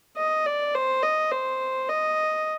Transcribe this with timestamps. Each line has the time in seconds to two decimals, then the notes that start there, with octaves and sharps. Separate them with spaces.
0.17 D#5
0.46 D5
0.75 C5
1.03 D#5
1.32 C5
1.89 D#5